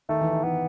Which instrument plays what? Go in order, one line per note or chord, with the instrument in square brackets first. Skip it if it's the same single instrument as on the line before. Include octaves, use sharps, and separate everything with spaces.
[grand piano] D#3 [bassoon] A3
[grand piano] E3
D#3
[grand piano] E3 [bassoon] B3